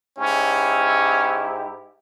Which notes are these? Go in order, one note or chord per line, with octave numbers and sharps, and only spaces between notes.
G#2 C#4 E4 G4